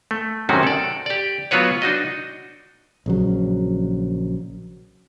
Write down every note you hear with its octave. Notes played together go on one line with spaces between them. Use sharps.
A3
F#2 C3 D#3 C4 C#4 F#4
A4 D5
G4 D5
F#3 B3 F4 F#4 B4 C#5
D4 D#4 F#4 D#5
A#1 C#3 F#3